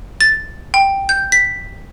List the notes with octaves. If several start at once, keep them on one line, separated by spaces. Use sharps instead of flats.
A6
G5
G6
B6